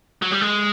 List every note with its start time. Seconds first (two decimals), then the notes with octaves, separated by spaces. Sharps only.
0.22 F#3
0.32 G3
0.42 G#3